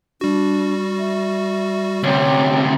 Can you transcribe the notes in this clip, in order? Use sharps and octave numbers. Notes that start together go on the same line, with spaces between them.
G3 D4 F#4
E5
D2 C3 C#5